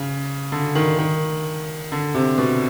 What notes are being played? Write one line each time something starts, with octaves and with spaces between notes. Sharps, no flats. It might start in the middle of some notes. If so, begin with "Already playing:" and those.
Already playing: C#3
D3
D#3
D#3
D3
C3
B2